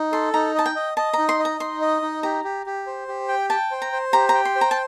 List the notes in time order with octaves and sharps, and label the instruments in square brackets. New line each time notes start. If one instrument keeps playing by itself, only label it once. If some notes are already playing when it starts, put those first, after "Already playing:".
Already playing: [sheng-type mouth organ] D#4
[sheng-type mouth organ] A4 [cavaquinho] C6
[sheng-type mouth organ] D#4 [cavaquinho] A#5
[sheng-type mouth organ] D#5 [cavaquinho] A5
[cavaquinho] G5
[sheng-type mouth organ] D#5
[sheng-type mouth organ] D#5 [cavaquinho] A5
[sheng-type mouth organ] D#4 [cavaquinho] A#5
[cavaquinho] C6
[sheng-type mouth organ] D#5
[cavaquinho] A#5
[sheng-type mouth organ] D#4 [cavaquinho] C6
[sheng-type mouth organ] D#5
D#4
[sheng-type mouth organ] G4 [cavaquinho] A#5
[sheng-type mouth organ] G4
G4
C5
G4
G5
[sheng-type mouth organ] G5 [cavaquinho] A5
[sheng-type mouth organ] C5
[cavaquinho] A#5
[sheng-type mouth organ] C5
[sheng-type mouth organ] G4 [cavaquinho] A#5
[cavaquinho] A#5
[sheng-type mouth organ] G5
[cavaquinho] C6
[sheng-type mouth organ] C5
[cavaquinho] A#5
A5